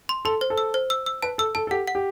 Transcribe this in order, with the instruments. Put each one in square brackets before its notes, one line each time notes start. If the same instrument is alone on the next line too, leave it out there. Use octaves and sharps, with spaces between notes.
[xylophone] C6
[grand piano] A4 [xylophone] C6
[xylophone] C5
[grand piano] A4
[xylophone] E6
C5
E6
E6
[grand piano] B4 [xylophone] A5
[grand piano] A4 [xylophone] E6
[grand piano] A4 [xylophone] A5
[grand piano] A4
[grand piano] G4 [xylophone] F#5
[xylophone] F#5
[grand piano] G4